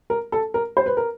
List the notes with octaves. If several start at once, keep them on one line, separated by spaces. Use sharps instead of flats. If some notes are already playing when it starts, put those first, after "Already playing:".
A#4
A4
A#4
C5
B4
A#4